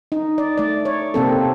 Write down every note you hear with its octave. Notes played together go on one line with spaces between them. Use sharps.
D#4
D5
A3 D5
C#5
C3 A#3 C4 A4